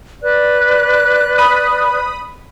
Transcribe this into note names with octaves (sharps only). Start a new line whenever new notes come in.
B4 D5 F#6
B5 D#6